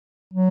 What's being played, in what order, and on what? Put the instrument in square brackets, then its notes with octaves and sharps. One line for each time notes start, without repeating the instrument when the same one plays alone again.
[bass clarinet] F#3